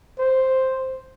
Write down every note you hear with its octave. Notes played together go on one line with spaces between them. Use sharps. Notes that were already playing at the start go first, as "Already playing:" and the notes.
C5